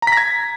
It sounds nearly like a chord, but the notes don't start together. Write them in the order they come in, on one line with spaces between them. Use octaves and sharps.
A#5 B6 A#6 G#6